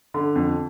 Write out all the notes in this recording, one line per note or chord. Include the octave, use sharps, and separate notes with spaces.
D3
F2